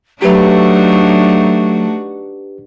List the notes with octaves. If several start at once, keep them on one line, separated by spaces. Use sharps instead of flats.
F#3 A3 D4 D#4 F#4 G4 B4